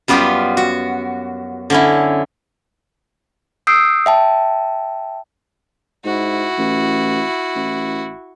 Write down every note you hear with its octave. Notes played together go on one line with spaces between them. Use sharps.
F#2 G3 B3 F4 B4 G5
F#4
D3 C#4 E4
D#6 E6 G6 C7 D7
E5 G5 A5
G#2 E4 F#4
A1
A1